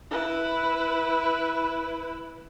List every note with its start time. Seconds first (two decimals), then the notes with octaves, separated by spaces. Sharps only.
0.10 E4 B4